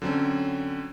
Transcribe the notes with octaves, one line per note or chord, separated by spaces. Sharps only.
D3 F#3 C4 C#4